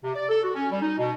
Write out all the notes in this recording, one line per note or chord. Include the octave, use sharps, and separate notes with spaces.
C3
D5
A4
F#4
C#4
G3
D#4
B2